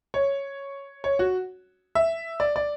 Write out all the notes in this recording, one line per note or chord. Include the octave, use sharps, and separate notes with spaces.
C#5
C#5
F#4
E5
D5
D5